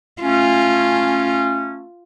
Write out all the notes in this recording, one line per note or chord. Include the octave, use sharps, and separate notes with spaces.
A3 C#4 F4